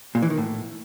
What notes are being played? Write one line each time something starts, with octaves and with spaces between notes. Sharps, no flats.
A#2
E3
D#3
A2